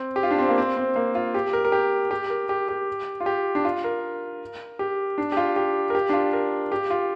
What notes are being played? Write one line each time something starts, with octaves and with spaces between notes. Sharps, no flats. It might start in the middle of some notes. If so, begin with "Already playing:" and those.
Already playing: C4
G4
F4
D4
C4
A#3
C4
C4
A#3
F4
G4
A#4
A#4
G4
G4
A#4
G4
G4
F4
G4
D4
F4
A#4
G4
D4
G4
F4
G4
A#4
G4
D4
F4
A#4
G4
F4